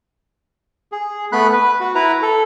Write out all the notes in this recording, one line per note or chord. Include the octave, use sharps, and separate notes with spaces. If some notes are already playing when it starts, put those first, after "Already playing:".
G#4
A3 B3 B5 F#6
B4
F#4
E4 B4 A#5
A4